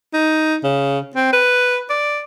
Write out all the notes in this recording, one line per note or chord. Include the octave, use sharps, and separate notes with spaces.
D#4
C#3
C4
B4
D5